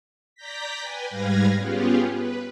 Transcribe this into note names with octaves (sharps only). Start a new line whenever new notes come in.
D5 A#5 G6 A#6 B6
B4 G5 G#5
G#2 G3 B4 F5 G#6 A#6
B3 C#4 F4 G4 G#4
B4